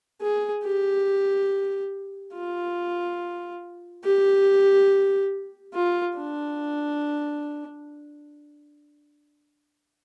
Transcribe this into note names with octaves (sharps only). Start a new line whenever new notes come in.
G#4
G4
F4
G4
F4
D4